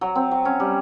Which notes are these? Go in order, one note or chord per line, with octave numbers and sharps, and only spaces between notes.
F#3
C4
F#3
C#4
G3